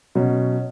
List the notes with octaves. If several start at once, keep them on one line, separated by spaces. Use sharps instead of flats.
B2 F#3 C#4